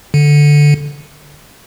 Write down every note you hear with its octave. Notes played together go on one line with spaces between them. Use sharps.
D3